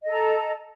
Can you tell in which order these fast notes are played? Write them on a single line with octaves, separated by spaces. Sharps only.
D#5 A4 A#5